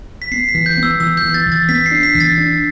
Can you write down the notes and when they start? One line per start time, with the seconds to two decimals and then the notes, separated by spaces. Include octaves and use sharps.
0.22 B6
0.31 B3 C7
0.49 B6
0.55 E3
0.66 G6
0.77 B3
0.83 E6
1.00 E3 E6
1.17 G6
1.23 E3
1.34 A6
1.46 E3
1.52 A6
1.69 B3 B6
1.86 C7
1.92 D4
2.03 B6
2.14 E3
2.20 A6
2.37 D4